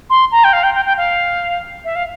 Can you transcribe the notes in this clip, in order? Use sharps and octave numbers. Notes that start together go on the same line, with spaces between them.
C6
A#5
G5
F5
G5
G5
G5
F5
E5
F5